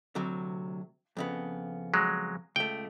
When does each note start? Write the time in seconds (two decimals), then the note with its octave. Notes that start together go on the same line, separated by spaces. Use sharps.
0.15 D2 C3 F#3
1.17 F2 C#3 B3
1.94 F#3 G#3
2.56 C#2 A3 G5